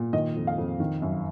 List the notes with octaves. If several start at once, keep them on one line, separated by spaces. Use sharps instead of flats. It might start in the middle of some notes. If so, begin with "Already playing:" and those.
Already playing: A#2
D#3 D#5
F2
F5
F2
D#3
F#2